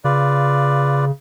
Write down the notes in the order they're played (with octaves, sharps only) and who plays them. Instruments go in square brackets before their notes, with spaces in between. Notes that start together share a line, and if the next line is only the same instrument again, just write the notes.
[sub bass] C#3 [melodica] F4 B4 D5